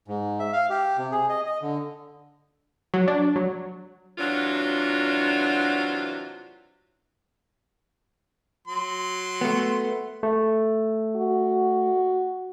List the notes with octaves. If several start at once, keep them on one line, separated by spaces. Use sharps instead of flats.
G#2
E5
F5
G4
C3
G#4
D#5
D#5
D3
F#3
D4
F#3
C3 E3 F#3 D4 F4
F#3 C6
A3 B3
A3
F#4